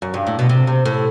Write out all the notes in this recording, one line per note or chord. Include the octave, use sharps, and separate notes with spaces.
F#2
G2
A2
B2
C3
C3
A2